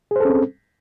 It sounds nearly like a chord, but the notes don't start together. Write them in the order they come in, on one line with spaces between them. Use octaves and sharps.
G#4 C5 A4 C#4 C4